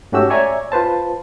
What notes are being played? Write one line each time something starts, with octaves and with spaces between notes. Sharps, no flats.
G#2 A3 C#4 F#4 G4 E6
C#5 D5 E5 G#5 A#5
F4 B4 C5 A5